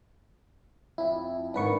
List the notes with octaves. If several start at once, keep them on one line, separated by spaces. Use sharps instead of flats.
F2 E4
G#2 D#3 D4 B4 C#6